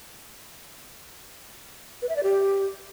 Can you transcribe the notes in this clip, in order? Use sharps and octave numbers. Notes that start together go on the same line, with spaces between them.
B4
E5
D5
G4